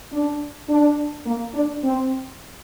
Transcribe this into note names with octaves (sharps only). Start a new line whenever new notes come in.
D4
D4
A#3
D4
C4